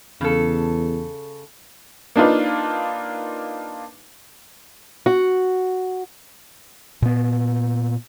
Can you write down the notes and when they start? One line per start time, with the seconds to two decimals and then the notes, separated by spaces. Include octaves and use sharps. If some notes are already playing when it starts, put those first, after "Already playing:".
0.21 E2 C#3 A4
2.16 A#3 D4 D#4 F4 B4
5.06 F#4
7.02 A#2 B3